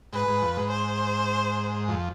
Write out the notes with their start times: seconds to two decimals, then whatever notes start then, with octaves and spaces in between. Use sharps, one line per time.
0.13 G#2 B4
0.28 G#2
0.42 F2
0.57 G#2
0.72 C5
1.88 F2